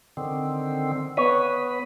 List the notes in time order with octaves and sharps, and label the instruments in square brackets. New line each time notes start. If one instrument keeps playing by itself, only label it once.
[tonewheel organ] D3 D#3 C4
[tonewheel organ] B3 B4 [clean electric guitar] C#5